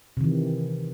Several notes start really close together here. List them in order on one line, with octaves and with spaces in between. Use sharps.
C3 D#3 E3